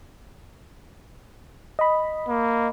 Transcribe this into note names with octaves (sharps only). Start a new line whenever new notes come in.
D#5 B5
A#3